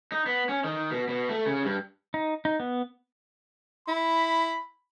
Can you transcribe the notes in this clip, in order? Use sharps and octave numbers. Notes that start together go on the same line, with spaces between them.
D#4
B3
C#4
D#3
B2
B2
A3
C#3
G2
D#4
D#4
B3
E4 B5